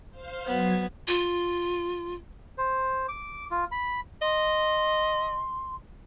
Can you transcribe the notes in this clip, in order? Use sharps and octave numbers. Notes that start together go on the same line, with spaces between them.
C5 F5
F#3 B3 G#6
F4
C5
D6
F4
B5
D#5 C6